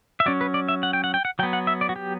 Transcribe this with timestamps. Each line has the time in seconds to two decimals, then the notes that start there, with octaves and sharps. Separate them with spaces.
0.20 E5
0.26 F#3 C#4 D5
0.41 B4
0.54 D5
0.68 E5
0.83 F#5
0.93 G5
1.04 F#5
1.14 G5
1.25 F#5
1.39 F#3 G5
1.43 B3
1.53 F#5
1.67 E5
1.81 D5
1.89 F#4
1.96 G4